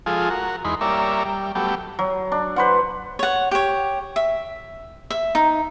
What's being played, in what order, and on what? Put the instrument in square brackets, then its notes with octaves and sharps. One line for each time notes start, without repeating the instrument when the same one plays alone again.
[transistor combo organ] F3 G#3 F4 G#4 A4
F#4 A#4
E2 G#3 D#4 B5 C6
G3 A#3 A#4 C#5 D5 E5
G3
F#3 G3 A3 B3 G4
[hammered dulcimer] F#3
D4
B4 C5 F#5
[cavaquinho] C#5 F#5
G4 C#5
E5
E5
D#4